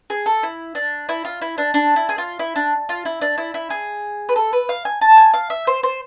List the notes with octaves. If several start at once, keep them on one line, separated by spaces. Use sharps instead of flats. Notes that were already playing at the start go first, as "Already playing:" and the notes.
G#4
A4
E4
D4
E4
F4
E4
D4
D4
E4
G#4
F4
E4
D4
F4
E4
D4
E4
E4
G#4
B4
A4
B4
F5
G#5
A5
G#5
F5
E5
C5
C5